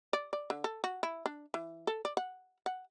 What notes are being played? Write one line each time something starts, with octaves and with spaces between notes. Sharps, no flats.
D5
D5
D3
A4
F#4
E4
D4
E3
A4
D5
F#5
F#5